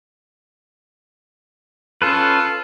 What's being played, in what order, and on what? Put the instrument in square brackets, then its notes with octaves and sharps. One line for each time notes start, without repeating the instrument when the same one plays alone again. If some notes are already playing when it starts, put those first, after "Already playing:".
[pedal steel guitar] C#4 A4 B4 [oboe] F4